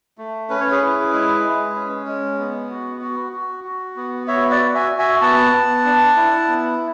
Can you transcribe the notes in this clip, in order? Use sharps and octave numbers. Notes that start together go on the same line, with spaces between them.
A3
C#4 B4
C#5
G#4 B4
E4
G#3
G#3
C#4
G#3
B3
F#4
F#4
F#4
F#4
B3
F#4 C#5 E5
D5 F#5
F#4
E5 G#5
F#4
E5 G#5
B3 F#5 A5
B3
D4
E4
B3